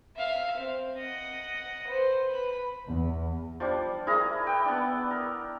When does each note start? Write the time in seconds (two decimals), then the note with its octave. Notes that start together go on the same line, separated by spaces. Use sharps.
0.16 E5 F5
0.57 C4
0.98 D#5 F#5
1.87 B4 C5
2.28 B4 B5
2.86 E2
3.60 F3 G3 D4
4.07 E4 G#4 A#4 A#5
4.47 B4 G5
4.65 B3 D4
5.11 A#4